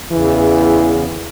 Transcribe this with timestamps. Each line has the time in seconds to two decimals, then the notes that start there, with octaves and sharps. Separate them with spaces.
0.12 E2 C#3 E3